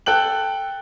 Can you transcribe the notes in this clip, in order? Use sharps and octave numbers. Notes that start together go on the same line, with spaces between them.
A4 G5 F#6 F#7